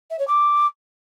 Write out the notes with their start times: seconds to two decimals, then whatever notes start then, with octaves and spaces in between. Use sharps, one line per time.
0.10 E5
0.19 C#5
0.27 D6